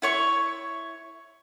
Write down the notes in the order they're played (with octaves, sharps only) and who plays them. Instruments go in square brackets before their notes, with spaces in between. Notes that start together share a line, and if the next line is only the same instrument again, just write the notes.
[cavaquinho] E4 C#5 C#6